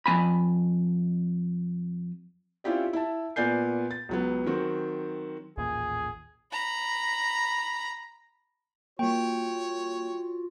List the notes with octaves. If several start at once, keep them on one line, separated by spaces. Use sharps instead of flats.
F2 A#3 G#5 B5
C4 C#4 E4 F4 G4 D5
E4 E5 A5
A#2 B3 D5 G#5 G6 C7
A6
C#2 F#3 B3
D#3 F#3 C4 F#4
A1 D#2 A#2 G#4
A#5 B5
G3 A#3 F4 F#4 C#5 G5